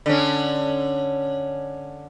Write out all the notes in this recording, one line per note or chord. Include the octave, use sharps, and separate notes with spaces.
D3 C#4